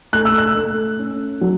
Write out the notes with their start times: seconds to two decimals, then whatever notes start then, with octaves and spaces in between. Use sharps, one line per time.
0.13 A3 F#6
0.25 E6
0.38 F#6
0.55 A3
0.99 C#4
1.41 F#3